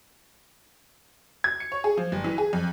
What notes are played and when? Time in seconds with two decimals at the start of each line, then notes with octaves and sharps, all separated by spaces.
1.44 G#6
1.60 C#7
1.72 C#5
1.84 G#4
1.97 F3
2.12 G1
2.24 E3
2.38 G#4
2.53 F2